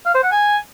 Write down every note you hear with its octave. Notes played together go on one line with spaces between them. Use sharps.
F5
C5
F#5
G#5